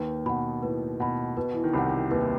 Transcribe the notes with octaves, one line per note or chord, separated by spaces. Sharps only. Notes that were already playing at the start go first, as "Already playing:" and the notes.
Already playing: D#2 D#3 B4
B2 F#5 B5
A2 B4
B2 F#5 B5
B2 B4
E3
D#3
C2 C3 F#5 B5
D#2 D#3 B4